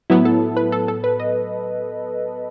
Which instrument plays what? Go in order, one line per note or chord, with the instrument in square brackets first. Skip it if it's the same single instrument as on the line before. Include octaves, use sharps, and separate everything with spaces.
[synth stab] A2 F#3 B3 [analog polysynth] E4
[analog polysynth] A4
B4
A4
A4
B4
D#5